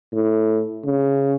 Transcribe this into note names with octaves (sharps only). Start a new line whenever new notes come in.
A2
C#3